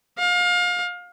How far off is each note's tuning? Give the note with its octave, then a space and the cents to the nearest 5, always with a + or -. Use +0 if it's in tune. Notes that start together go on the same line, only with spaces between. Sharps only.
F5 +30